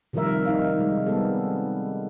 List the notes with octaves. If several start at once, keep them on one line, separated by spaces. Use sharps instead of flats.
C3 D#3 F3 G3 A#4 E5
D#4 F5
C3 G3 G#3
G3 G#3 B3 C4 A4